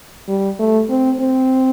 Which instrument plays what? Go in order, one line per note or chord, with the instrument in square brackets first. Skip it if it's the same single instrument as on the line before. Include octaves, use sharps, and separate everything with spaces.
[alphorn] G3
A3
C4
C4